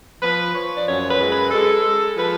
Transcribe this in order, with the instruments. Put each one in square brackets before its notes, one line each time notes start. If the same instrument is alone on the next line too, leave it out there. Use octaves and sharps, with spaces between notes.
[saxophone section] F3 B4
F3 C#5
D5
F#2 C#5
B4
G#3
B4
G#3 A4
G#3
F3 B4